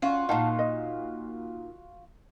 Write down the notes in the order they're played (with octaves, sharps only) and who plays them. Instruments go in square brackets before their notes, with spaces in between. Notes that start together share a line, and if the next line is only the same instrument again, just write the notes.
[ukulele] C#4 [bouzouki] F4 F#4
[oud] A#2 D#4 [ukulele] F5 F#5 A5
[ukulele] D#5